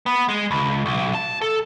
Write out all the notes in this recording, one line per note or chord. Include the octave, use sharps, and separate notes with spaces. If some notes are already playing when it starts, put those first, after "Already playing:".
B3
G#3
C#2
B1
A5
A4